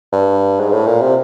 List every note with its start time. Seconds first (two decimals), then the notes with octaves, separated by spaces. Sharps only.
0.12 G2
0.60 G#2
0.72 A2
0.87 A#2
1.02 C3